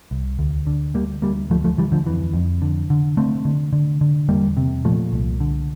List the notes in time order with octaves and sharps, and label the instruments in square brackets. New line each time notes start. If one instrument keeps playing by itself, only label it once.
[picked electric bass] C2
D2
D3
D2 G3 A#3
D2 G3 A#3
D2 F3 A3
F3 A3
D2 E3 G3
D3 F3
F2 E3
F2
D3
D3
D3 A3 C4
D3
D3
D3
E2 G3 A#3
C3
A#2 F3 A3
C2
D3